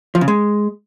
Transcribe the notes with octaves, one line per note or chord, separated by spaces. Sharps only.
F3
C#3
G#3